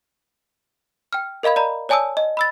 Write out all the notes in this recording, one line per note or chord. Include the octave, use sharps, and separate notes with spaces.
G5 F6
A#4 D#5 F5 B5 G#6
D5 A#5 B5
C#5 D5 G#5 A5 D#6 E6
D#5
B5 E6 A6